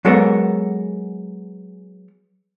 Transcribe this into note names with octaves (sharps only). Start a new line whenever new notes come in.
F#3 G#3 B3 A4 A#4